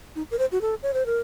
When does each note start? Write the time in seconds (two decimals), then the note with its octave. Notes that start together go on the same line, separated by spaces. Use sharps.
0.16 D#4
0.31 A#4
0.39 C5
0.52 F#4
0.61 A4
0.83 C#5
0.94 C5
1.06 A#4